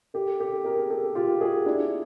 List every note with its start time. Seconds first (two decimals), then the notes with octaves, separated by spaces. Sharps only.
0.14 G4 A4
0.40 G4 A4
0.65 G#4 A#4
0.90 G4 A4
1.15 F4 G4
1.41 F#4 G#4
1.66 D4 E4